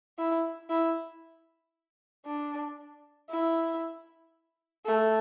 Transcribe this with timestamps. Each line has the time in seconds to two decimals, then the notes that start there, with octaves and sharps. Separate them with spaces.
0.18 E4
0.70 E4
2.26 D4
3.30 E4
4.86 A3